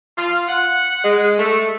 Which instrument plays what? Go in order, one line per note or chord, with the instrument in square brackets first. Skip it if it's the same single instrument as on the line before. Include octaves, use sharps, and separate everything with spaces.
[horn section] F4
F#5
G#3
A3